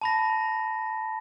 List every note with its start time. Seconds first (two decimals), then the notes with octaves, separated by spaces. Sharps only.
0.01 A5 B5 A#6